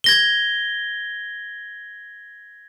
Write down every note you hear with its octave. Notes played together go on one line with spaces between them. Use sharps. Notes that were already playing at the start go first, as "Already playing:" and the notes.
G#6 A#6 G7